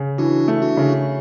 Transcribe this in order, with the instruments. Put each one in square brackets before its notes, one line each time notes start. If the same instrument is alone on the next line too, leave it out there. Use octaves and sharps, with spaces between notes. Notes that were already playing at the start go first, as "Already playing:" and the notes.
Already playing: [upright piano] C#3
[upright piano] E3 [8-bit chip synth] D4 F#4
[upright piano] A3
[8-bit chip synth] D4 F#4
[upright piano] C#3